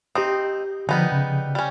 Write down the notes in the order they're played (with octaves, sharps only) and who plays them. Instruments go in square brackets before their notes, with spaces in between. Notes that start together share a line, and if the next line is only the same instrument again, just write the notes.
[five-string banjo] C4 D#4 [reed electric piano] G4 D#6
[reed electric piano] D3 F3 [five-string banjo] G3 B3 D#4
[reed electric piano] C#3
[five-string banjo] G3 C#4